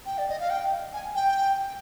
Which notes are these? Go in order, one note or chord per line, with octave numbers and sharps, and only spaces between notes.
G5
D5
D#5
F5
G5
G#5
G5